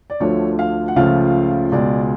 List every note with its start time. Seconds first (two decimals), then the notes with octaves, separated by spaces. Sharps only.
0.10 D5
0.20 D2 D3 F3 A3 C#5
0.59 F5
0.88 F#5
0.96 C#2 C#3 F3 A3 F5
1.72 C#2 B2 G#3 D5